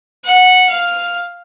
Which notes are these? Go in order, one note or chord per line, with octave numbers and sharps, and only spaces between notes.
F#5
F5